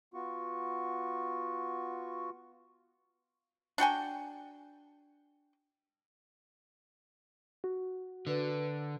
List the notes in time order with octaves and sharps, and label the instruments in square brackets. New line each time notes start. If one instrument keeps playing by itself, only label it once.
[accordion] B3 F4 F#4 C#6
[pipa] D4 F#4 G5 G#5
[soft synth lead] F#4
[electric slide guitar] D3 [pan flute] B4